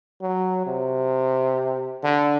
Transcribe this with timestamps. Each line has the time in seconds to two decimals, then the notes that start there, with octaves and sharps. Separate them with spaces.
0.22 F#3
0.66 C3
2.04 D3